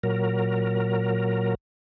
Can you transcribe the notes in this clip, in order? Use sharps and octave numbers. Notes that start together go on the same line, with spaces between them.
A#2 F#3 A#4